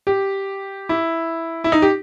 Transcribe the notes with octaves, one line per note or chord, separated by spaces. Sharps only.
G4
E4
E4
D#4
G4